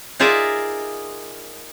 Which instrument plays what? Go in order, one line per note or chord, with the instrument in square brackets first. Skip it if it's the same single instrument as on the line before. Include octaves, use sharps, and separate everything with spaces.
[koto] D#4 F4 G#4 A#4 D5 E5